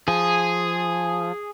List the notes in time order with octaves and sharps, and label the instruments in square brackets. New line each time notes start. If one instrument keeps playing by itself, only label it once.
[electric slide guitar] F3 [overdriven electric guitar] G#4